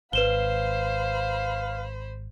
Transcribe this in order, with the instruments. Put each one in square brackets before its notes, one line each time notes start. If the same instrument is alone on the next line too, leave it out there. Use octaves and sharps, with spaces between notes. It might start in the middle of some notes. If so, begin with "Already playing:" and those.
[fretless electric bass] G#1 [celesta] B4 E7 G7 [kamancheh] C5 B5 [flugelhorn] F5